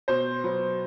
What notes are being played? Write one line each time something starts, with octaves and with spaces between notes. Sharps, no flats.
B2 C5
F#3 B3